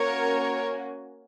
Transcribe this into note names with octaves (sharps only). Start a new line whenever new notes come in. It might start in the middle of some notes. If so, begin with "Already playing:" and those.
Already playing: A#3 C#4 F#4 A#4 C#5